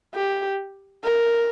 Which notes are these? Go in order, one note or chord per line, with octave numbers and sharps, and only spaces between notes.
G4
A#4